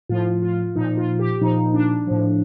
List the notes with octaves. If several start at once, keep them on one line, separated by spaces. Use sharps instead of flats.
A2 F3 F4
F4
A#2 F3 D#4
F4
G4
A#2 F3 D#4
D4
A2 F3